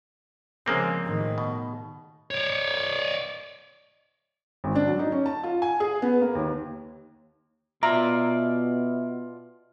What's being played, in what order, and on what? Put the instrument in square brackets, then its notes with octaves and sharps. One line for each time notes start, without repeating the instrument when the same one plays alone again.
[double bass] C#3 F3 [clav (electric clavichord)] G#3 A#3 C4
[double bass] A2 D#3
[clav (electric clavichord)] B2
[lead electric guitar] C#5 D5
[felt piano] G#1
D4
F#3
D#4
C#4
A5
F4
G#5
G#4
B3
A#3
D#2
[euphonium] B2 [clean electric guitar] F4 D5 [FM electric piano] E5 [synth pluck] A#5